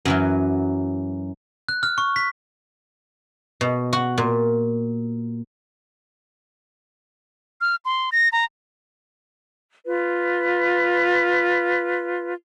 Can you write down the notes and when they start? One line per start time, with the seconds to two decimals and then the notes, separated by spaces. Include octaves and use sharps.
0.05 F#2 E3 F#3
1.69 F#6
1.83 F6
1.98 C#6
2.16 B6
3.61 B2
3.93 F#4
4.18 A#2
7.61 F6
7.85 C6
8.12 A#6
8.32 A#5
9.86 F4 B4